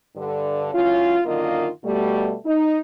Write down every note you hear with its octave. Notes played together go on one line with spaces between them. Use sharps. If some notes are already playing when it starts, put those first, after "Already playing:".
G2 D3
F#3 C#4 E4 F4
F#2 D3 D#3 A#3 F4 D#5
B2 G3 A3
D#4